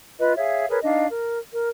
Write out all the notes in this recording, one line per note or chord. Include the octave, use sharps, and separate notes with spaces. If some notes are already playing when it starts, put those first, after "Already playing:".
F4 B4 D#5
G#4 C#5 E5 F5
G#4 A#4 B4 C#5
D4 D#4 D#5 F5
A#4
A#4